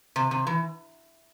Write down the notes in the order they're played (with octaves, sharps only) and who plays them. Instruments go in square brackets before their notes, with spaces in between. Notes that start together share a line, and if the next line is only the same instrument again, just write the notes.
[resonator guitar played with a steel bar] C3
C3
E3